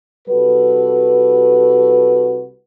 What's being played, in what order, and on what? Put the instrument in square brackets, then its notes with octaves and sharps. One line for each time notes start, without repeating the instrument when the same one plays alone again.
[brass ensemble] C2 G3 F#4 A4 B4